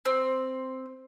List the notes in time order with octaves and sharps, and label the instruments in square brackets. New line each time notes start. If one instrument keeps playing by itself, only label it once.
[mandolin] C4